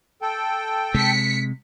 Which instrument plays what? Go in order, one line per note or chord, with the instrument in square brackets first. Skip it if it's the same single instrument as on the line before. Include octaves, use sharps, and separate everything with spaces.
[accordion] A4 G5
[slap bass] C3 G#3 [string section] B6 C#7